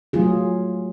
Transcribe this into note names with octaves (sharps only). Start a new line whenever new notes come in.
F#3 A3 F4 G#4